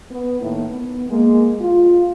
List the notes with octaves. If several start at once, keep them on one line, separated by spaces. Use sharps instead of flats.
B3
A2 D#3 A3 A#3 E4
B3
G#3 A#3
F4